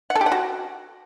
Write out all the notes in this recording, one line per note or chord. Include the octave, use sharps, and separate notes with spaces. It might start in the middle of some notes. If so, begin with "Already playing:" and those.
F#5
A4
G4
F#5
F#4